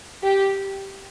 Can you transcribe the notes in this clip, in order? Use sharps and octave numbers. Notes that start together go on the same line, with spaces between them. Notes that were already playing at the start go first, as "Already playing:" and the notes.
G4